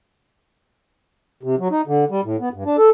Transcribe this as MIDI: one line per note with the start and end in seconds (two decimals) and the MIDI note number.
1.43 1.55 48
1.59 1.68 54
1.71 1.81 63
1.87 2.05 50
2.11 2.21 55
2.24 2.36 45
2.40 2.49 59
2.53 2.64 43
2.65 2.77 62
2.78 2.90 69